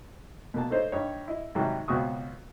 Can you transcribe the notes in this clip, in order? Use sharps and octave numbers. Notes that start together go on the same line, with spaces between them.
B2 A#3 A5
A3 D#4 C5 C#5 D#5
G2 D#4 C#5
E4 D#5
G#2 C3 D#3 F#3 G3
C#2 B2 C4 F#4 C#6 D#6